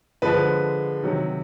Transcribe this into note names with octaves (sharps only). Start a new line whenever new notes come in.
D3 F3 G#3 B4
C3 D#3 F#3